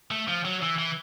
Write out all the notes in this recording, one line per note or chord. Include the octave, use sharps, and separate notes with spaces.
A3
F3
F#3
E3
E3